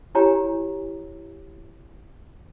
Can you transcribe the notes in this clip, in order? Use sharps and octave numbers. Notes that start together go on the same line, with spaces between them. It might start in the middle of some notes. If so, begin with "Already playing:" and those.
E4 F#4 G4 C#5 G#5 A#5